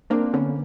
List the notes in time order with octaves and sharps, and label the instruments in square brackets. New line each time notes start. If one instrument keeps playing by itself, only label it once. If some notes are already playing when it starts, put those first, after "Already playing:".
[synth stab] A#3 [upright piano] C4 D4
[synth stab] D3 [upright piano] B3 C#4